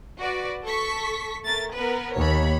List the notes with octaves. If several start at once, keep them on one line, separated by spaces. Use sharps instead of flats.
F#4 B4 D5
A4 C#6 B6
A3 A#4 A6
B3 A#4 B4
D#2 C#5 B5